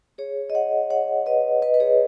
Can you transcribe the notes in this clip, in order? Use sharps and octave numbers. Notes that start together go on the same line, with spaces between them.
G#4 C#5
D#5
C#5 F#5
C#5 F#5
B4 D#5
B4 D#5
B4
G#4 C#5